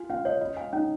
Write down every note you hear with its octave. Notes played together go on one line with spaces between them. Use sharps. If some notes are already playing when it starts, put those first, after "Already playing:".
Already playing: F4 G#5
C#4 F5
C#5 D#5
F4 D#5
F5 G#5
C#4 D#4